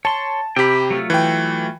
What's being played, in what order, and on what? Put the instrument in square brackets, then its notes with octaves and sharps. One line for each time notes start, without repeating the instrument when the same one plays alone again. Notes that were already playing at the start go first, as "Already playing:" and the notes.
[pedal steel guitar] C#5 C6 [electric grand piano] A5
[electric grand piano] C3 G4 [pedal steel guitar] G5 B5
[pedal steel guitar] F#3 A3 F4
[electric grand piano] E3 G5